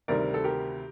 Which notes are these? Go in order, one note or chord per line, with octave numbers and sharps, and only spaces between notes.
D2 C3 D#3 G3 A#4 D5
A4
G4 A#4